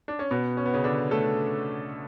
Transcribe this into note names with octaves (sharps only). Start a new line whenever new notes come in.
D4
C#4
B2 B3
C#4
B3
C#3 C#4
D3 D4
A3 A4